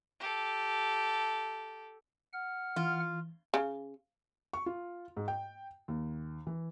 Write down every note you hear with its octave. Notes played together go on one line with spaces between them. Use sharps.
G4 A4
F#5 F6
E3 F4
C#3
C#6
F4
G#2
G5
D#2
E3